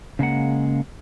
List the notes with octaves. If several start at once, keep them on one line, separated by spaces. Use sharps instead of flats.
C#3 G#3 A#3 F#5